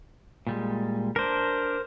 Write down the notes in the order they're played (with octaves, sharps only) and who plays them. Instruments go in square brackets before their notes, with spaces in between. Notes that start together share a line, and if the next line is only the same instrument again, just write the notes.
[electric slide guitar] A#2 G3 G#3
[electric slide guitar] D4 [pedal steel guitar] A#4 C5